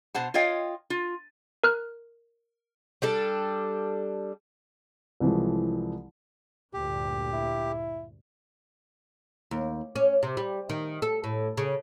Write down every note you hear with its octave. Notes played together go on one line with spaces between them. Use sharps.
B2 C5 F#5 A5
F4 C#5 D#5 F5 G5
F4
A#4 F6 F#6
G3 D4 A4
C2 E3 F3 G#3
D2 G2 A#2 G4
E4
D#2
C#4
C3
G3
D#3
A4
A2
C#3